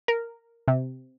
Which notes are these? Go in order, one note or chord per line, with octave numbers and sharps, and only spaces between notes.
A#4
C3